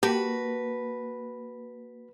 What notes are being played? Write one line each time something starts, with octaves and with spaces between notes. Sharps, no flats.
A#3 F#4 G4 B4 A5 B5